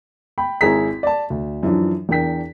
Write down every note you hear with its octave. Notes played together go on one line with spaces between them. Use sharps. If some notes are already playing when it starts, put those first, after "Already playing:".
G5 B5
G#1 E4 G#4 A#5 B6
D5 A5
D2
F#2 E3 F3 D4
E2 D4 A#4 G5 B6